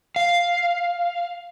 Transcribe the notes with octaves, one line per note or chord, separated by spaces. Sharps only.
F5